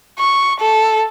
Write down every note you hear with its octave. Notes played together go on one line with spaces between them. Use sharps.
C#6
A4